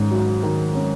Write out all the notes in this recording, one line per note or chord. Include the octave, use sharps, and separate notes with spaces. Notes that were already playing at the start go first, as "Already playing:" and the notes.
Already playing: G#2 D#3 C#4
F#3
D#3
C#4